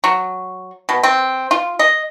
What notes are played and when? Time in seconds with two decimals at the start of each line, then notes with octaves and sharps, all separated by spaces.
0.04 F#3
0.89 B2
1.03 C4
1.51 F4
1.79 D#5